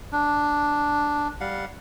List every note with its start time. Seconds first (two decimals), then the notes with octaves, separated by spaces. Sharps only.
0.12 D4
1.40 G3 F5 F#5